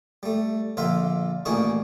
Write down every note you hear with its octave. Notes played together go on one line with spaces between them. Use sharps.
G3 A3
A#1 D3 F4 E5 F5 G5
A1 A#2 D#3 G#4 A5 C#6